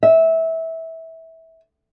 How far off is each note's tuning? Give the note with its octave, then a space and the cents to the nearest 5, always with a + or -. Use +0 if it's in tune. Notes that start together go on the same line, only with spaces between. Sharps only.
E5 -20